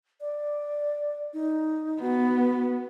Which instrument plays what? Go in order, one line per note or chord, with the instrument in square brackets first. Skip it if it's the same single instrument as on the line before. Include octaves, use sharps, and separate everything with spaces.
[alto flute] D5
D#4
[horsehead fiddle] B3 [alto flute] F#4